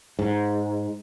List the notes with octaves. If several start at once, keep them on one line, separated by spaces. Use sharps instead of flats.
G#2